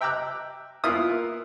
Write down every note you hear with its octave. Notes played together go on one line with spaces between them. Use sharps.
E5 G5 A#5 D6 E6 F#6
A#3 B3 E4 F4 D#6 F6